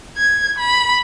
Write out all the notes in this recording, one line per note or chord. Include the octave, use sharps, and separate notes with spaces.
G#6
B5